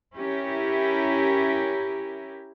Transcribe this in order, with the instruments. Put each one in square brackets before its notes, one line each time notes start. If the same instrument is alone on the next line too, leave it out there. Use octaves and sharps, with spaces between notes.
[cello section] C#4 E4 G4 A#4